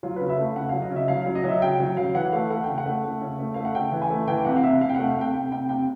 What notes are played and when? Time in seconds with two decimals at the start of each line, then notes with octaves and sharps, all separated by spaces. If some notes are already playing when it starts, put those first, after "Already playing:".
0.03 F#3 F4
0.16 C#3 B4
0.29 E5
0.38 A3 F5
0.56 C#3 F#5
0.69 F#3 F5
0.82 D#5
0.90 C#3
0.96 E5
1.08 F#3 F5
1.22 F#3 F5
1.35 D#5
1.44 F#3 E5
1.62 C#3 G5
1.80 F#3
1.97 F#3 F5
2.14 E3 F#5
2.32 A3 F5
2.51 A3 F#5
2.64 C#3 G5
2.78 F#5
2.86 A3
3.04 A3
3.21 C#3
3.39 A3
3.54 A3 F5
3.65 F#5
3.75 C#3 G5
3.92 E3
4.02 G#5
4.10 A3
4.27 E3 G5
4.45 C3 F#5
4.56 F5
4.63 C3 E5
4.81 C3 F5
4.89 G5
4.95 A3 F#5
5.07 F5
5.16 C3 G5
5.34 C3 G5
5.51 C3 G5
5.69 C3 G5